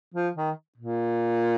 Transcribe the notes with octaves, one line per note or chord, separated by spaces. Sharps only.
F3
D#3
A#2